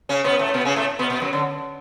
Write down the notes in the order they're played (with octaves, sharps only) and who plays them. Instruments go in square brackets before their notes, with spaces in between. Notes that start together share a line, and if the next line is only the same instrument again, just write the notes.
[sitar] C#3 C#4
B2 B3
A2 A3
B2 B3
C#3 C#4
A2 A3
B2 B3
B2 B3
F#2 F#3
D3